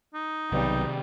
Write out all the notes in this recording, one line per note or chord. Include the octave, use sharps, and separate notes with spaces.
D#4
B1 C3 D#3 G3